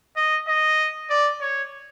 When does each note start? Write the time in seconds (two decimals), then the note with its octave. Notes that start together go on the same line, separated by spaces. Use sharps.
0.17 D#5
0.48 D#5
1.10 D5
1.41 C#5